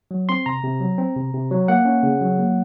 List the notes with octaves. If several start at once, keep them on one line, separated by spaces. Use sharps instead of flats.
F#3
C4 C6
C3 A#5
C3
F#3
C4
C3
C3
F#3
A#3 F#5
C#4
C#3
F#3
A#3